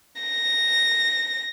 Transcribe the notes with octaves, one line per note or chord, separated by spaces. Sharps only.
A#6